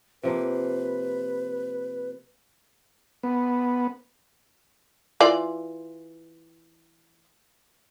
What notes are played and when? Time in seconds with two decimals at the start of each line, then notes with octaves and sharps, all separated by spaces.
0.23 C3 F3 A#3 B4
3.23 B3
5.21 E3 F4 D5